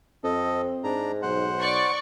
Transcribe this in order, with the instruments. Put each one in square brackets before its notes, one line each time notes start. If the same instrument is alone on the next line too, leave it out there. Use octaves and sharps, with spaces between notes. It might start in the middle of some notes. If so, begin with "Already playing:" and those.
[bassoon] F2 [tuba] C4 [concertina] A4 D#5
[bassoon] G#2 [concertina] D4 A#5
[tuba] B1 [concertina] C5 F#5
[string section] D5 C#6